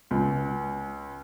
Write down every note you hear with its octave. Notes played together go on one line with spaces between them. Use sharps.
C#2